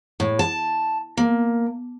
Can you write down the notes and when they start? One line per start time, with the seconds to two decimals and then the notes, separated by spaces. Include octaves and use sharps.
0.20 A2
0.39 A5
1.17 A#3